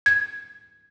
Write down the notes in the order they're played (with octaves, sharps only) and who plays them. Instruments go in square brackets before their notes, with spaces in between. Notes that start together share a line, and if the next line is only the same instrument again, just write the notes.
[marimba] G#6